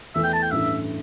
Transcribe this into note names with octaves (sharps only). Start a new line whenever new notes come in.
E2 E3 A3 E5
G5
A5
G5
A1 G2 E3 A3 E5